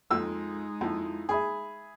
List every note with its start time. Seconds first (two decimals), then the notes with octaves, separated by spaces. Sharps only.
0.11 F2 G#3 D#4 A4 E6
0.81 F2 E4 A5
1.29 G#4 E5 B5 D#6